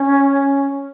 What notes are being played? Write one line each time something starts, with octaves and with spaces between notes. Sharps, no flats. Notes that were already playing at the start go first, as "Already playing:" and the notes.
Already playing: C#4